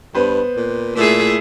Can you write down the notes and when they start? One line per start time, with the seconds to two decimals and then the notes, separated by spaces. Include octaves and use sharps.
0.15 G2 B3 B4 C5
0.56 A#2
0.96 A#2 A3 E4 G#4